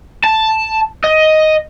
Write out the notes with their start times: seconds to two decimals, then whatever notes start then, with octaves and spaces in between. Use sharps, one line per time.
0.24 A5
1.04 D#5